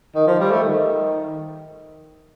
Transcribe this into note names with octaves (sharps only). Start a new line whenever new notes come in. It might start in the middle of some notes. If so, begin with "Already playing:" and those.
D#3
F3
G3
A3
D#3